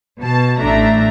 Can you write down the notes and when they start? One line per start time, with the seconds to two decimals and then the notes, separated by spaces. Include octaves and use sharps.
0.20 B2 A5
0.60 A1 A3 D4 E5 A#5